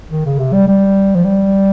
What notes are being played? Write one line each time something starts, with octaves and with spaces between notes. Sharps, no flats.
D#3
C#3
C3
G3
G3
F3
G3